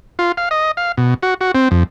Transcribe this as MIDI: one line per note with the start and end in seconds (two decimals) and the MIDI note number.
0.19 0.32 65
0.37 0.49 77
0.51 0.71 75
0.77 0.92 77
0.98 1.14 47
1.23 1.34 66
1.41 1.52 66
1.55 1.69 60
1.71 1.83 41